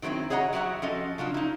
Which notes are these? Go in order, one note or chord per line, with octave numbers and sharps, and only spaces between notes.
D#3 F#3 B3 C4 E4
G#4 C#5 D#5 F#5 A#5
F#3 F#4 G4 E5 F#5
F3 C#4 A4 D#5
C#3 F#3 D4 F4
D#4 E4